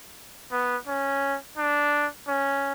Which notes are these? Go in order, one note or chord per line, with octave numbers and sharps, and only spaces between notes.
B3
C#4
D4
C#4